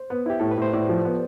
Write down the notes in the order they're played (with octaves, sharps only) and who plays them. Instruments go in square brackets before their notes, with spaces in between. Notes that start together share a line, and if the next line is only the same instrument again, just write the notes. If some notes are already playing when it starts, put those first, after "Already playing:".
Already playing: [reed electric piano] C5
[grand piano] B3
[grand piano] E4 [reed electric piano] G4
[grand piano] A2 [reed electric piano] A4
[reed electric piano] B4
[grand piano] A2 [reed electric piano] C5
[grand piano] A2 [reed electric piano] D5
[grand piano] F3
B3